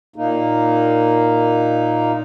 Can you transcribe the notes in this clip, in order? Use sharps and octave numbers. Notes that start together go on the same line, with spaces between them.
A#2 A#3 D#4